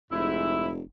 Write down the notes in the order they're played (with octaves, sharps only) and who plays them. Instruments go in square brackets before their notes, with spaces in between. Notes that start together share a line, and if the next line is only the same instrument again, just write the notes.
[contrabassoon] F1 [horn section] G#2 E4